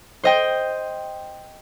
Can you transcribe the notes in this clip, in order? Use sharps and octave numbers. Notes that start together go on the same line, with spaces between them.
C5 D#5 G5